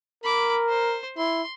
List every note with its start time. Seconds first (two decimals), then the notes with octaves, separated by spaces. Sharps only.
0.24 A#4 B5 D6
0.69 C5
1.18 E4 C6